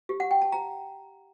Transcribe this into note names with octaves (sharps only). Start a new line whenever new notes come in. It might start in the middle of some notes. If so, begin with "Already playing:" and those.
G4
F#5
G5
A5
A#5